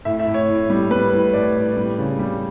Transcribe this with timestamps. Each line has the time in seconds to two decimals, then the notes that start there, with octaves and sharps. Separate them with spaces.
0.05 A2 E5
0.20 E5
0.27 A2
0.34 C#5
0.48 A2
0.70 G3
0.91 G3 B4
1.13 A2
1.33 A2 D5
1.55 A2
1.77 G3
1.99 C#3
2.19 G3